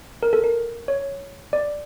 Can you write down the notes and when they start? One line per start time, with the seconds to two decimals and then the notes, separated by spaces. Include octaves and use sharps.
0.23 A#4
0.33 A4
0.44 A#4
0.88 C#5
1.53 D5